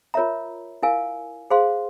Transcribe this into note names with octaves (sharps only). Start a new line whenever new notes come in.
F4 A#4 C#5 E5 A#5
E4 A#4 F5 G#5
G#4 C5 F5 C6